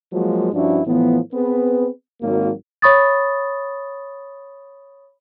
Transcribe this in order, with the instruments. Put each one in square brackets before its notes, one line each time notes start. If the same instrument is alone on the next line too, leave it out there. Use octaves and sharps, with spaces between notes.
[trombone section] F3 F#3 G#3 A#3 F#4
G2 F3 C#4 D4 E4 F#4
A2 E3 F3 B3
B3 C4 G#4 B4
G#1 F#3 A#3
[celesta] C#5 B5 C#6 D#6 A6